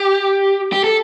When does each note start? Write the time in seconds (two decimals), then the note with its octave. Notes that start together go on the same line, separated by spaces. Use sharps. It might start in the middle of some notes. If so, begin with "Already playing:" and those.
Already playing: G4
0.73 G4
0.84 A4